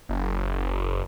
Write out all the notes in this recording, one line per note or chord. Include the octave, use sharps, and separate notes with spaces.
F#1